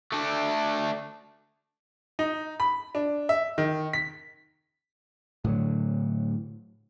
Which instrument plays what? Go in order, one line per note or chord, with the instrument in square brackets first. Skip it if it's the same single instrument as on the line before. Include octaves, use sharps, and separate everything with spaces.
[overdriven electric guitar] A3 D4
[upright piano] D#4
B5
D4
E5
D#3
B6
[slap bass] A2 D3 F#3